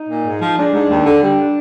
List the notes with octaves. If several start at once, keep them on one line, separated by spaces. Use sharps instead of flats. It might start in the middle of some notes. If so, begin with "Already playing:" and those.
Already playing: D#4
A#2
G#2
F3
G#3 D4
G#2
D#2
D3
G3